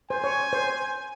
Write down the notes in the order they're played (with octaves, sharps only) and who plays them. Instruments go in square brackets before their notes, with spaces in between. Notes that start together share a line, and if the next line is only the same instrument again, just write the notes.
[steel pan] C5 [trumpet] G#5
[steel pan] C#5
C5